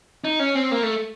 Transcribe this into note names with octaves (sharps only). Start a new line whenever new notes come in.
D#4
C#4
C4
A#3
A3